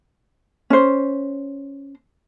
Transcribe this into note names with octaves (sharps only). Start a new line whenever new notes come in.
C#4 C5